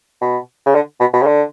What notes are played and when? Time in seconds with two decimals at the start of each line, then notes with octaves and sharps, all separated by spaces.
0.21 B2
0.66 C#3
0.75 D3
1.00 B2
1.13 B2
1.22 C#3
1.26 D3